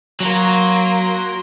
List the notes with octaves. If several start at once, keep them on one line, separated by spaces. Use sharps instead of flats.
F#3 A#3 C6